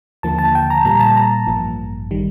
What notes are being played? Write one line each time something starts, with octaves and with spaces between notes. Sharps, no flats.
D#2 D3 F3 A#3 A5
A5
G5
A#5
A#2 G3 A#3 A#5
A5
A#5
A1 G2 F3 A#3
D#3 G3